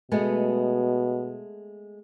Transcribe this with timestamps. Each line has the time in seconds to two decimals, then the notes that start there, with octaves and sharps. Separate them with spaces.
0.12 B2 G#3 A3 B3